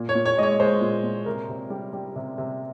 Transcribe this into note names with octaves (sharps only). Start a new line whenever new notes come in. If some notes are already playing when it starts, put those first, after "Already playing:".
Already playing: A#2
C#5
A#2
C#5
G#3 D#5
C#5
G#3 C5
A#2
A#2
C3 A#4
C3
G3
G3
C3
C3